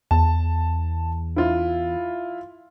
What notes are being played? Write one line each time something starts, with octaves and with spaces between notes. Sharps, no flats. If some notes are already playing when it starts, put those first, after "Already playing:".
E2 A5
E4 F4